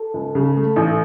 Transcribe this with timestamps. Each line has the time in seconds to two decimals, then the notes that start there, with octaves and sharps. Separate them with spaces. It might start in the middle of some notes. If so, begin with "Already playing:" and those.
Already playing: A4
0.14 C#2
0.35 C#3
0.56 A3 A4
0.76 A1